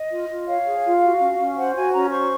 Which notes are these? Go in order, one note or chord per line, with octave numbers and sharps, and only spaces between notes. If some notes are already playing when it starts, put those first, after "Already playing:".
Already playing: D#5
F4
F4
C#5 F5
G#4
F4
F#4
C#4
C#4
C5 F#5
F#4 G#5
C#4 A#5
C5 C#6